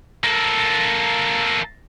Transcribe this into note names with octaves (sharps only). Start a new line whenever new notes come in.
A#3 A4